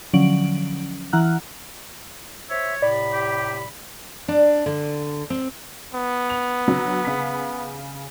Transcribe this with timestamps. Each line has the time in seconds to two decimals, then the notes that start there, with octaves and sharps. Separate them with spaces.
0.13 D3 F3 F#3 C#4 D7 F#7
1.13 E3 E4 F#5 A#5 F6 F#6
2.50 C5 C#5 E5
2.82 A2 C3 D5 B5
3.12 G4
4.28 D4
4.66 D3
5.30 C4
5.94 B3
6.30 F7
6.68 D3 F#3
7.05 C#3 B6